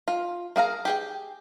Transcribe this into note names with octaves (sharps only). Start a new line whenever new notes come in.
F4
A#3 G#4 F5 A#5
G4 G#4 G5